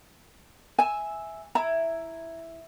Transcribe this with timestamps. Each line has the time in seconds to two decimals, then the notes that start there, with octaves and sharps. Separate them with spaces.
0.79 E5 G#5 E6
1.55 E4 A#5